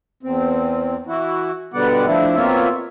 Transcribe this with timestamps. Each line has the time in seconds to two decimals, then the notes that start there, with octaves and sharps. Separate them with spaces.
0.23 E2 C4
1.07 E3 E4 F#4
1.74 B2 D3 G3 B3 D5 F#5
2.06 F3 A3 D4 E4
2.36 B2 A#3 C4 F4 C#5 E5